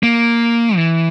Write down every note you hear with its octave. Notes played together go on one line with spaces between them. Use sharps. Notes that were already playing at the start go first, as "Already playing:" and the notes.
A#3
E3